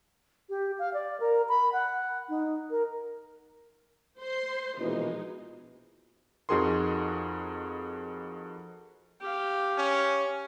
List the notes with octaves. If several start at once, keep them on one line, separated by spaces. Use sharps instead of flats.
G4
F5
D5
A#4
B5
F#5
D#4
A#4
C5 C6
A#1 B2 E3 G#3 D#4
F2 D#4 F#4 G#4 A#4 C6
G4 F5
C#4